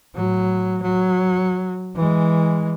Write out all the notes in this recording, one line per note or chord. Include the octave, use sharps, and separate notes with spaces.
A2 F#3
F#3
E3 G#3